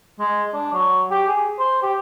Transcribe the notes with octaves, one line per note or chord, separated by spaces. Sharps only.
G#3
D4
F#3
G4
G#4
C5
G4